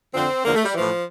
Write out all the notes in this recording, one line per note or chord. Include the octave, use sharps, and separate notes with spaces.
F2 D3 F3 C4
E2 D3 F3 A#3
A3
G3
A2 E3 F3